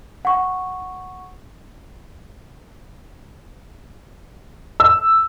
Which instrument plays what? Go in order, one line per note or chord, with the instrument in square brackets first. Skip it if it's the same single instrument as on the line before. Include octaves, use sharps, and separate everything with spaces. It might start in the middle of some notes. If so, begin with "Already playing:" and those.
[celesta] F#5 C#6
[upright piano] E6